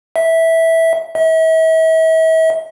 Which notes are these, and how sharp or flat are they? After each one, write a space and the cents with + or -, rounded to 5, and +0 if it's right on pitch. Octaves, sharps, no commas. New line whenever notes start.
E5 -10
E5 -40